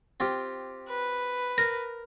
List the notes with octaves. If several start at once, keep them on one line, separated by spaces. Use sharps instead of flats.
C4 F4 G4
B4
A#4 A#6